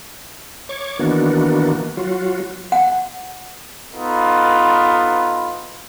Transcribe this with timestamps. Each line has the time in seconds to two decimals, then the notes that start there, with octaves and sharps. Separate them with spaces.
0.69 C#5 C#6 D6
0.99 D#3 E3 A#3 B3 D4 F#4
1.97 F#3 F4 F#4
2.72 F#5
3.94 B3 D#4 F4 A4 B4